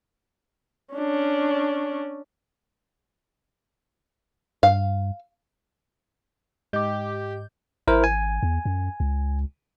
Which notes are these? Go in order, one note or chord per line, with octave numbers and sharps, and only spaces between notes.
C#4 D4
G2 F5
G#2 G4 D#5 D6 G6
G#1 E4 A#4 C5
G#5
E2
F#2
C#2